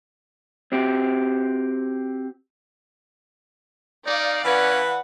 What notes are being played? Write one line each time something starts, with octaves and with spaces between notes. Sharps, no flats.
C4 F#4 G4
D#4 D5 F5
E3 C#4 B4 F#5